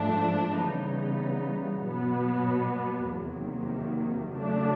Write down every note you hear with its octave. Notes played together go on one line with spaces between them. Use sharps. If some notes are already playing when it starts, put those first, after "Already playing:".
Already playing: G#2 F3 A3 D4
C#3 E3 G3 B3 D#4
B2 F#3 B3
E2 C3 D#3 F#3 A#3
C#3 F#3 A3 D4